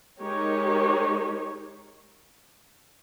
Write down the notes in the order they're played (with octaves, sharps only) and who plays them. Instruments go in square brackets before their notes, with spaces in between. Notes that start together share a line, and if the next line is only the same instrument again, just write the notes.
[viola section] G#3 D#4 G4 A#4 C#5